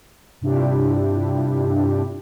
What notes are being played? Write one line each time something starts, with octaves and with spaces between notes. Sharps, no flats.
G2 C3 D4 E4 F4 G4